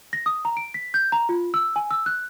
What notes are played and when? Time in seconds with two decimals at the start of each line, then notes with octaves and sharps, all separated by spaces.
0.13 A#6
0.26 D#6
0.45 A#5
0.57 D7
0.74 B6
0.94 G6
1.12 A#5
1.29 F4
1.54 E6
1.76 G#5
1.91 E6
2.06 F#6